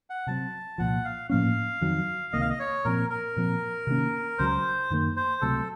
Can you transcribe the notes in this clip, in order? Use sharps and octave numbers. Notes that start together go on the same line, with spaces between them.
F#5
C3 F#3 C4 A5
C2 A#2 F3 F#5
F5
A2 F3 A#3 C#4 F5
F2 D#3 F#3
C#2 C3 D#3 A#3 D#5
F5
D#5
C#5
A#2 F3 C4 A#4
A#4
A#2 F3 C4
C3 D#3 A#3 C#4
C#2 C#3 F#3 C5
F#2 D#3 A#3
C5
C#2 C3 F#3 A3 A4